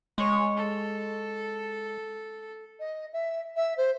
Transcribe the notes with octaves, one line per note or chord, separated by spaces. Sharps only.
G#3 C#5
A4
D#5
E5
E5
C5